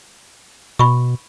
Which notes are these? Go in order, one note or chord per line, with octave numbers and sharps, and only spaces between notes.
B2 B5 C#6